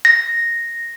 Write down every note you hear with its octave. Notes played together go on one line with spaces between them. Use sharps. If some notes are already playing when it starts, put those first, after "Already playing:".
A#6